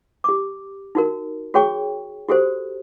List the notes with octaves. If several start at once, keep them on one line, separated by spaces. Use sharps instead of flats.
G4 D6
D#4 F#4 A#4
F#4 G#4 C#5 G5 C#6
F#4 G4 A4 C5